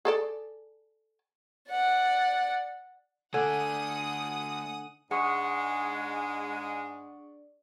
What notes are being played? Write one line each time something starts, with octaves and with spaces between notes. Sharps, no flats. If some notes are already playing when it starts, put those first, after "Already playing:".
G#4 A4 D5
D5 F#5
D3 A3 D5 F#5 G#5 D#6
G#2 G#3 D4 G#4 F#5 C#6 D#6 C#7